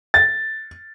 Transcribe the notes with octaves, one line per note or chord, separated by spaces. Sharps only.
A6